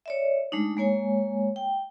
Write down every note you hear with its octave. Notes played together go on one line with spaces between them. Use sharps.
C#5 D5 E5
G#3 A3 D4 D#4
G#3 A#3 C#5 G#5
G5